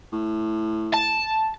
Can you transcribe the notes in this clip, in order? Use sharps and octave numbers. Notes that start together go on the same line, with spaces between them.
A2
A5